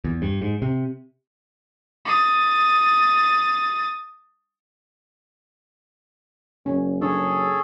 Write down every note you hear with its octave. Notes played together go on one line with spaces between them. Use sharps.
E2
G2
G#2
C3
D#6 A6
F#1 C#4
D4 G#4 A4 C#5